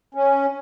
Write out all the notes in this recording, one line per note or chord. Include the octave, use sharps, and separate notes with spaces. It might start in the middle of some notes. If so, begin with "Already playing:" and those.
C#4